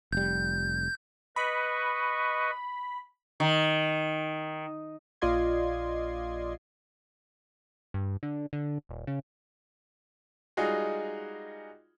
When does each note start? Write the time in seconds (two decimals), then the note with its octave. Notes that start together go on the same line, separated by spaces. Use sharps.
0.12 F1 G3 G6
1.36 B4 D#5 B5 C#6
3.40 D#3
5.22 A#1 F4 D5 D#5 C6 G#6
7.94 G2
8.23 D3
8.53 D3
8.89 D#1
9.07 C#3
10.57 G3 G#3 D#4 F4 F#4 G#4